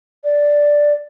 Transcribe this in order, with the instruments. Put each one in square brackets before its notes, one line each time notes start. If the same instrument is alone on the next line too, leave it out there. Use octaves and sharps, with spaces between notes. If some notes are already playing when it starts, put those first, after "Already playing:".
[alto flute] D5